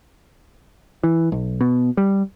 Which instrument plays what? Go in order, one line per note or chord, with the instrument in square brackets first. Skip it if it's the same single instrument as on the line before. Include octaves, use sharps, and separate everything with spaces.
[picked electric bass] E3
B1
B2
G3